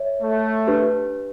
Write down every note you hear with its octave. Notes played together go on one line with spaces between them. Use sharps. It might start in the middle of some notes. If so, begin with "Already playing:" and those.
Already playing: C#5 E5
A3
D4 G4 B4